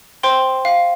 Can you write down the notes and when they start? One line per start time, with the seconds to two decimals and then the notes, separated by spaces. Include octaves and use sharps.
0.23 C5 G5 C6
0.65 F5